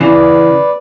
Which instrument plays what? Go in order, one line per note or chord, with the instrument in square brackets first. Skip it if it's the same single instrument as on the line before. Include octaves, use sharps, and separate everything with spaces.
[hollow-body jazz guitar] C#3 E3 [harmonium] B4 D5